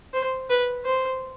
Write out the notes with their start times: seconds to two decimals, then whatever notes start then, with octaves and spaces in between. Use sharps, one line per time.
0.13 C5
0.49 B4
0.85 C5